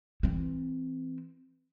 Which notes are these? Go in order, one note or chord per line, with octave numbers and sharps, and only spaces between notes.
E3 C4